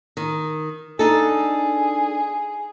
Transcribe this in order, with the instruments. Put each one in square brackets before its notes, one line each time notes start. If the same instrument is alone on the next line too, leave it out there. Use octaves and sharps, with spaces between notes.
[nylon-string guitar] D#3
[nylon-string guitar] D4 D#4 A4 [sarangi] G#4